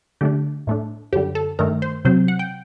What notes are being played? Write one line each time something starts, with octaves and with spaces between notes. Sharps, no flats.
D3 A3 D4 G4
A2 A3 D4
F#2 D3 G3 G4
A4
G2 D#3 A3 A#4
C5
C3 F#3 C4 C5
F#5
G5